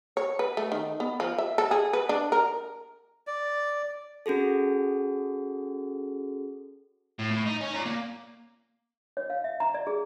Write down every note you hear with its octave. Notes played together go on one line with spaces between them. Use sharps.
C#5
B4
A3
D#3
B3
F3
E5
A4
G#4
B4
D4
A#4
D5
C#4 F#4 G#4 A4
A2
A2
D#4
C#4
D5 A#5
A#3
C#5
F5
E5
A#5
D5
G#4